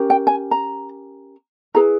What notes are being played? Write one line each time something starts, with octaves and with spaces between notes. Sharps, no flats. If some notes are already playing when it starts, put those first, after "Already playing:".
Already playing: C#4 G4 A#4
G5
G#5
A#5
E4 G#4 B4 A#5